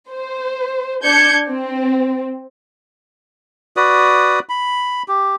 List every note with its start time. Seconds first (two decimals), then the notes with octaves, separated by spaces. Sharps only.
0.10 C5
1.04 D4 G6 G#6 C#7
1.49 C4
3.77 F#4 B4 D5 D#6
4.49 B5
5.08 G4